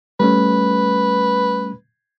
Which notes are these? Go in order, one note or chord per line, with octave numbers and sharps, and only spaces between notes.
G3 A3 C#4 B4